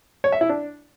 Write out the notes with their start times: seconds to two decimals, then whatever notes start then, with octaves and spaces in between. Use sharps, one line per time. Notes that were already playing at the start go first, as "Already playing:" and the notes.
0.24 C#5
0.32 E5
0.41 E4
0.49 D4